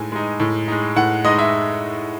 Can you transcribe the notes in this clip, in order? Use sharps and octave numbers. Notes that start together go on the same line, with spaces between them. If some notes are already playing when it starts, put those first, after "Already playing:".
Already playing: A2 G#3 D#4 G#5
G#3 D#4
A2
G#3 D#4
A2 F#5
G#3 D#4 D#5
E5